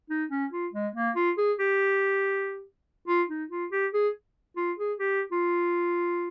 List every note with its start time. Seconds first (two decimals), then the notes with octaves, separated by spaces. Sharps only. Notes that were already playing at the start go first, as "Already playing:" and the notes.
0.10 D#4
0.31 C#4
0.52 F4
0.73 G#3
0.95 A#3
1.16 F4
1.38 G#4
1.59 G4
3.08 F4
3.29 D#4
3.50 F4
3.72 G4
3.94 G#4
4.57 F4
4.79 G#4
4.99 G4
5.32 F4